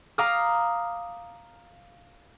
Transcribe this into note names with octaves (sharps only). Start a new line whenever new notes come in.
F5 A#5 D6 D#6 F6